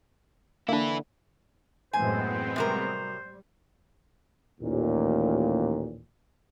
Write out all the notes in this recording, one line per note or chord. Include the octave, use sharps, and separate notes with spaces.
D3 A#3 D4 E4 B4
F#2 A2 E3 G#3 B3 C4 C5 G#5
C3 F#3 G3 A#4
A1 D#2 A#2